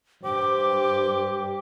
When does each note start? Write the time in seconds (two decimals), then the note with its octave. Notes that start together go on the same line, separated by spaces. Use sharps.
0.24 G2 G4 C5 D6